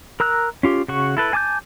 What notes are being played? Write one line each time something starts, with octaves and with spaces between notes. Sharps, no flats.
A#4 A#5 E6 F#6
C#4 F4 G4
C#3 F#4 C#6
E4 A4 B4
G#5 A5 D6 E6 G6